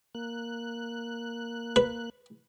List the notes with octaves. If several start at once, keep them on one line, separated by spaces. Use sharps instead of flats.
A#3 F#6
B4